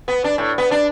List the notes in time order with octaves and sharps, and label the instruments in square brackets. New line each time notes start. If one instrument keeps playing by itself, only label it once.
[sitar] B3
D4
A2
B3
D4